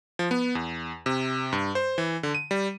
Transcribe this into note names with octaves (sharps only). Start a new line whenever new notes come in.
F3
B3
E2
C3
G2
C5
E3
D3
D#7
G3